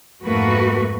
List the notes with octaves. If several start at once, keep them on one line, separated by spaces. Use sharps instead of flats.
F2 G#2 A3 A#3 F#4 B4